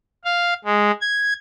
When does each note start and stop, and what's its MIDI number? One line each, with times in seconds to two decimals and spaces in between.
0.24 0.54 77
0.65 0.91 56
1.01 1.33 92